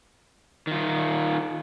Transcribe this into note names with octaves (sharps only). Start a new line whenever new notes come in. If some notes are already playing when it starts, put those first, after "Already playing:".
D#3 F4